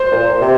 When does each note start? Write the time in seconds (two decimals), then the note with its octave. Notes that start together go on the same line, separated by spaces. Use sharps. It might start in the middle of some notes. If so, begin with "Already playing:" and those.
Already playing: C5
0.11 A#2
0.41 C3